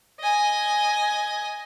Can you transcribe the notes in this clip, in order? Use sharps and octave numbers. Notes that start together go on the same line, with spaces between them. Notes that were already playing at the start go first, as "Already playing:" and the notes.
D#5 G#5